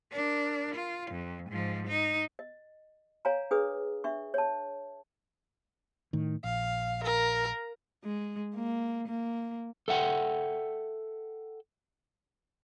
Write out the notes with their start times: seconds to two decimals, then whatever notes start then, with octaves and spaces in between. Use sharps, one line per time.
0.12 D4 A#4
0.75 F4
1.11 F2
1.50 G#2 F3
1.87 D#4
2.39 D#5
3.25 C#5 F5 G#5 A#5
3.51 D4 G#4 B4 D#6
4.04 D4 E5 C#6
4.34 C#5 A5
6.13 A2 D#3
6.44 A#1 F5
7.04 A#4
8.04 G#3
8.55 A#3
9.08 A#3
9.88 A4 E5 F#5 G5